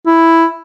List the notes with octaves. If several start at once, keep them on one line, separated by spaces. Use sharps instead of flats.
E4